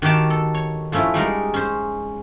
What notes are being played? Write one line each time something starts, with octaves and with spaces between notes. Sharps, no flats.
D#3 F#4 G4 F5 G5 A5
A4
C#5
F3 A3 C#4 E4
G3 G#3 D#4 A#4
C#4 C5